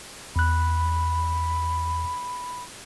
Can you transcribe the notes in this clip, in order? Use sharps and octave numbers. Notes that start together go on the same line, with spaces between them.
E2 B5 F#6